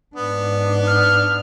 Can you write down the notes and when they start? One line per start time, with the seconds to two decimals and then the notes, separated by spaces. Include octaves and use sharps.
0.16 G#2 B3 D4
0.87 F6